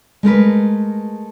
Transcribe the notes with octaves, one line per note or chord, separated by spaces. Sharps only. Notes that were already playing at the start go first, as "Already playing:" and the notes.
G#3 A3 A#4 B4